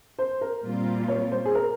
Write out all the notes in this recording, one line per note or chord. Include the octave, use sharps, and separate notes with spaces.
C5
A#4
A#2 G3 C4 F4
C#5
C5
G#4
A#4